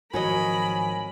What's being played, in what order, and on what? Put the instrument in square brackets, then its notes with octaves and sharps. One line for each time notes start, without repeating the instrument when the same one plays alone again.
[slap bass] G#1 F3 [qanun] F#3 C#5 D#5 [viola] A#4 B5 [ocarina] G#5